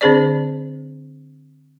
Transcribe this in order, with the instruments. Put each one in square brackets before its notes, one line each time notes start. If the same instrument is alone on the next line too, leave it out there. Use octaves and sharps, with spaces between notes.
[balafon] D3 C4 D4 G#4 C5 D5